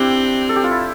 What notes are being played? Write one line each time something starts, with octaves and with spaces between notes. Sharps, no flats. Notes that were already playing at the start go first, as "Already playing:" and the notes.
Already playing: C4 D4 E4 G4
A4
G4
F4
E4